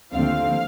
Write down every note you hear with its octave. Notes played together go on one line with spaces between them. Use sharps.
D#2 D3 F3 A3 C4 F5